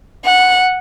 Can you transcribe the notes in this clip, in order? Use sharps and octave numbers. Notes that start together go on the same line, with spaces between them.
F#5